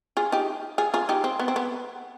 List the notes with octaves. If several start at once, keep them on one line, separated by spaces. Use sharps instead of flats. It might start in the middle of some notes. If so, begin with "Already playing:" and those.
F4 G#4
D#4 G4
F4 G#4
F4 G#4
D#4 G4
C4
B3
C4
B3